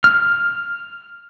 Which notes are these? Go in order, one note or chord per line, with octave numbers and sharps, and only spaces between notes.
F6